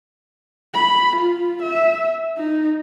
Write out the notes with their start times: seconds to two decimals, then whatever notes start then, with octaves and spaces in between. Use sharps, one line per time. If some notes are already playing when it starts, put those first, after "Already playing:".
0.74 B5
1.16 F4
1.62 E5
2.37 D#4